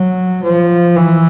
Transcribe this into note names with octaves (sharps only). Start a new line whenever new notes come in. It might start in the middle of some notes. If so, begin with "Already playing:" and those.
Already playing: F#3
F3
E3